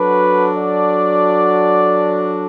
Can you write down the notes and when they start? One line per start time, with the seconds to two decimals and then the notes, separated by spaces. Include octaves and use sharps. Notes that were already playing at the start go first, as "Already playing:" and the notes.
Already playing: F#3 D4 F#4 A4 B4
0.57 D5